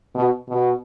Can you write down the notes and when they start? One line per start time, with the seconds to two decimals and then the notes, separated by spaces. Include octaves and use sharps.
0.15 B2
0.49 B2